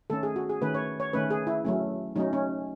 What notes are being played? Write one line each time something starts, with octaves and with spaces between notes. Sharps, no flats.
D#3 A3 C#4 A4
G#4
F#4
G#4
D#3 A3 C#4 B4
C#5
C#5
D#3 A3 C#4 B4
G#4
E4
F#3 A3 C#4
F#3 A3 C#4 D#4
C#4